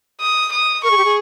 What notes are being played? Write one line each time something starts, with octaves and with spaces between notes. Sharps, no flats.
D#6
D#6
A#4 C#6
G#4
G4
G#4